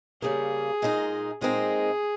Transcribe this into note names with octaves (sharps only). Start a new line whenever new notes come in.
C#3 G3 A#3 G#4
A#2 G#3 D#4 A#4
A#2 G#3 C4 D#4 G#4 A#4